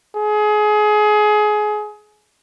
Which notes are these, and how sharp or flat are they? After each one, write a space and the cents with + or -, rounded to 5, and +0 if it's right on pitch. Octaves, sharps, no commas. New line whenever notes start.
G#4 +25